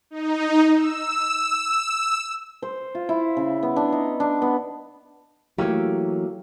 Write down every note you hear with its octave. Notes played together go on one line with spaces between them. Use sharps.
D#4
E6
C5
F4
E4
C#3
B3
D4
D#4
D4
B3
E3 F#3 A3 A#3 G4